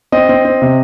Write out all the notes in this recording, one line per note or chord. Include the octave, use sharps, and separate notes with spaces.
C4 D#5
C4
C4
C3